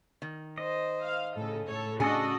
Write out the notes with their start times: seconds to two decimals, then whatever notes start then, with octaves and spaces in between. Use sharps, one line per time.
0.22 D#3
0.58 C5 D#5
1.02 F5
1.36 A2 C#3 A4
1.67 A2 A4 C#5
2.00 C#3 D4 F#4 G#4 A4 D#5 C#6